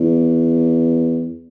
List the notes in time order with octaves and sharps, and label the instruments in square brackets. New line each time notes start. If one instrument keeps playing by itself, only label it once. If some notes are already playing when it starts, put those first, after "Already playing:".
Already playing: [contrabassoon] E2